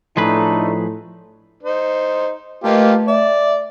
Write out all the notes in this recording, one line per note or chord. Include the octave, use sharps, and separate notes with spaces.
A2 F3 A3 D4 D#4 G#4 B4
D#4 C5
A3 A#3 F4 G4 B4 D#5
D5 E5